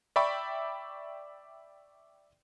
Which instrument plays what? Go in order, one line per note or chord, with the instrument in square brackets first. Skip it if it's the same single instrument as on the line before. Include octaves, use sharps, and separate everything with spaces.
[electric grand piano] D5 E5 G5 B5 C#6 D6